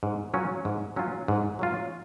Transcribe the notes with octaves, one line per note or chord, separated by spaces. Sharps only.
G#2
F#3 C#4 F4
G#2
F#3 C#4 F4
G#2
F#3 C#4 F4